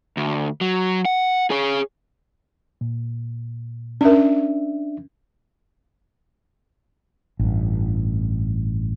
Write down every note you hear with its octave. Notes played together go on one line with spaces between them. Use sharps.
D2
F#3
F#5
G#4 C#5
A#2
C#4 D4 A#4 E5
A1 G2